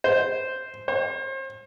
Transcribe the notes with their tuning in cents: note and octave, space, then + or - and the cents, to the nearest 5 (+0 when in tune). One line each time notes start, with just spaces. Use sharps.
C5 -5
C5 +40